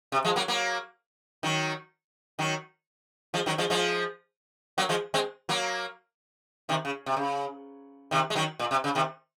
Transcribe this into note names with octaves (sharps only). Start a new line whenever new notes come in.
C3
F3 G#3
F#3 A#3
F#3 A#3
D#3 F#3
D#3 F#3
F3 G#3
D#3 F#3
F3 G#3
F3 G#3
F#3 A#3
F3 G#3
G#3 C4
F#3 A#3
C3 D#3
C#3
C3
C#3
C3 D#3
G#3
D#3 F#3
A#2
C3
C#3
C3 D#3